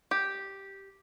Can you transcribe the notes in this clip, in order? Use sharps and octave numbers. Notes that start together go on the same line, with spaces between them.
G4